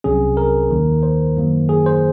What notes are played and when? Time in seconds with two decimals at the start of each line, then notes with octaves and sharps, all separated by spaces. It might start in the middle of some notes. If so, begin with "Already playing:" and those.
0.04 C2 C3 F#3 C#4 G#4
0.37 A#4
0.70 D#2 D#3 A#3
1.03 C5
1.37 F#2 D#3 F#3 A#3
1.69 G#4
1.86 C5